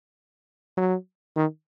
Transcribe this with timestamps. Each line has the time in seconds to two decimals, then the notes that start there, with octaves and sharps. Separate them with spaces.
0.77 F#3
1.36 D#3